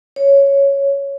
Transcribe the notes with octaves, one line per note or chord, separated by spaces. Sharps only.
C#5